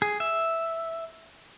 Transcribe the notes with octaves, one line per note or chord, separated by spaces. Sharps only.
G#4
E5